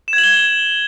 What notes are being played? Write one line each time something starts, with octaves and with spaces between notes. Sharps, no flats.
E7
G#6
F#7
G7